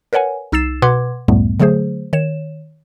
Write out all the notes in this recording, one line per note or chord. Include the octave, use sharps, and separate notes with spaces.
A#4 B4 C#5 F#5 G#5
C2 D#4 E6 A6 C7 E7
B2 B4 F#5 C6 D6 G#6
C#2 F#2 A2 G3 A3 B3
D3 F#3 A3 G#4 C5
D#3 C#5 E7